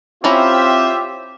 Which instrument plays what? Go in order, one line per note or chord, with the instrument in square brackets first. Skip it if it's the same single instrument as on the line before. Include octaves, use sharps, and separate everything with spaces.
[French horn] C4 [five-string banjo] C#4 E4 A#5 [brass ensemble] F4 C5 E5 [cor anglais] G4